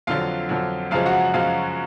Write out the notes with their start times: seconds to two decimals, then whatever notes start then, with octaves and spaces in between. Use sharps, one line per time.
0.07 F2 D3 F#3 F4 F5
0.49 F2 D3 F#3
0.91 F#2 C#3 F3 G#3 F4 F5
1.06 F#4 F#5
1.33 F#2 C#3 F3 G#3 F4 F5